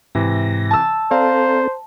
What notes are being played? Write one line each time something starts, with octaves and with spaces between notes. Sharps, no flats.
G#2 C3 E3 A#6
A5 E6
C4 A4 C5 D5 F5 A#5